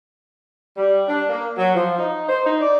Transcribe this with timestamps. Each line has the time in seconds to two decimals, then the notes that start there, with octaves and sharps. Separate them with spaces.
0.77 G3
1.08 D4
1.29 A#3
1.58 F#3
1.75 F3
1.99 D#4
2.28 C5
2.45 D#4
2.61 D5